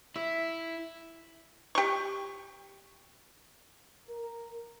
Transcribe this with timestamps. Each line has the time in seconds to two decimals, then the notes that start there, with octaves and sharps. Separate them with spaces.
0.16 E4 E5
1.75 G4 C#6
4.08 A#4